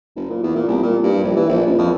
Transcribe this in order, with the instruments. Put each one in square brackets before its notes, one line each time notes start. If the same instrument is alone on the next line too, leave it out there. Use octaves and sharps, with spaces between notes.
[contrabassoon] F#1
A#2
E2
A#2
C2
A#2
G2
A#1
E3
A#1
C#2
F2